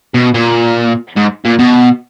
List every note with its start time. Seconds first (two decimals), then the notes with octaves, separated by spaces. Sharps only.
0.14 B2
0.34 A#2
1.17 G#2
1.45 A#2
1.59 B2